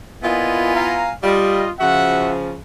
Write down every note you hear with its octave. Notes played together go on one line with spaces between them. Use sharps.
A#2 B3 E4 F4 D#5 G#5
F5 G#5 A#5
G3 F4 D#5
C#3 F3 F#4 E5 F#5